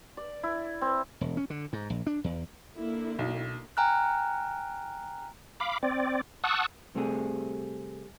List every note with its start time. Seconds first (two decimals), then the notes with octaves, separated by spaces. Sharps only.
0.17 D5
0.43 E4
0.81 C4
1.21 E1
1.37 C#4
1.50 D3
1.73 G#2
1.90 A#1
2.07 D4
2.24 E2
2.76 D3 A#3 E4
3.19 B1
3.77 G5 G#5 A#5 F6 F#6
5.60 F5 B5 D6
5.83 C4 D5
6.44 F#5 A5 C#6 D#6 E6 F#6
6.95 C3 G3 A3 C4 F4 G#4